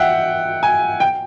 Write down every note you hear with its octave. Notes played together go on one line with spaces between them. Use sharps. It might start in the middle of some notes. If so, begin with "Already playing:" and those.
Already playing: E5 F#5 G5
G#5
G5